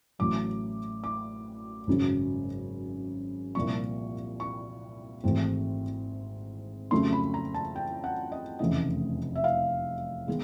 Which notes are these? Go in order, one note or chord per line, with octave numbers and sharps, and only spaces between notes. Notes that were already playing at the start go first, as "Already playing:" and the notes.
A1 A2 F#3 A3 D6
D6
G#1 F#2 C#3 F#3
C2 A#2 F3 A#3 C#6
C#6
G#1 G#2 E3 A3 C4
F2 C#3 F#3 A3 C6
B5
A#5
A5
G5
F#5
D#5
F1 E2 C#3 E3 A3 D#5
E5
F5
D#3 G#3 B3